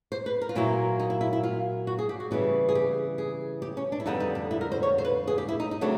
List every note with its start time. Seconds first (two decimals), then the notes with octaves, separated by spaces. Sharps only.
0.12 C5
0.26 B4
0.41 A#4
0.49 F4
0.55 A#2 F#3 A#3 E4
1.00 D#4
1.10 E4
1.21 E4
1.33 E4
1.43 F4
1.87 F#4
1.99 G#4
2.09 G4
2.20 F#4
2.31 C#3 E3 G3 B3 F#4
2.69 G#4
2.75 G4
3.18 G#4
3.62 G4
3.77 C#4
3.92 D4
4.00 E4
4.06 F2 D3 G3 B3 D#4
4.20 D#4
4.35 D4
4.51 E4
4.61 A#4
4.72 C5
4.83 C#5
4.98 C5
5.05 B4
5.27 G#4
5.38 G4
5.48 E4
5.60 D#4
5.71 D#4
5.81 C#3 F#3 A3 C4 D4